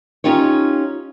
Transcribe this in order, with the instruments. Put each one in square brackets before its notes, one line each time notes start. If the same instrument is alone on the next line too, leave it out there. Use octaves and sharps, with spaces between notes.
[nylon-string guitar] C#4 D#4 F4 G4 C#5